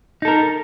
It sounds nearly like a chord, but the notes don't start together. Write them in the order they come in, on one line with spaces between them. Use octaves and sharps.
D#4 A4 A#4